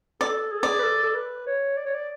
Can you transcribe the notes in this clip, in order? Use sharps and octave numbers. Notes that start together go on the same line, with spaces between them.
A4 D5
G#4
A4
G#4 D5
B4
A4
A4
B4
C#5
D5
C#5
D5